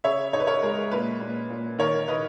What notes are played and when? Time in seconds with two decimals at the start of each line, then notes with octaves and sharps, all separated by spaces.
0.04 C#3 C#5 E5
0.33 D#4 C#5
0.40 B4
0.47 A#4 C#5
0.62 G#3 A#4
0.91 A#2 B4
1.20 A#2
1.50 A#2
1.79 D#3 A#4 C#5
2.08 D#3 B4 D#5